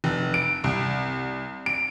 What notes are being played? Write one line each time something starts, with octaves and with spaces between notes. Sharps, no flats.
F1
D7
C2
D7